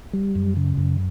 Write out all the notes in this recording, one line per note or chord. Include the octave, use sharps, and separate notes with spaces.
G3
F#2
C#3
F#2